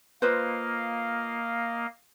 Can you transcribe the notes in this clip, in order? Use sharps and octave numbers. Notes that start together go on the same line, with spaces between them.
A#3 F4 B4 C5 D#5 F5